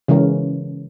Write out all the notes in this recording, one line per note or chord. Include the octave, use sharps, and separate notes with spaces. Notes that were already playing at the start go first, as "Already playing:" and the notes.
C#3 E3 G#3 C#4 A#4